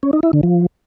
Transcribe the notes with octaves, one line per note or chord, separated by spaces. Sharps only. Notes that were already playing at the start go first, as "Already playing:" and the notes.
C#4
D#4
E4
D3
F3